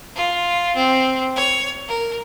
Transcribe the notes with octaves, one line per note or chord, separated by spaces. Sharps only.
F4
C4
C#5
A#4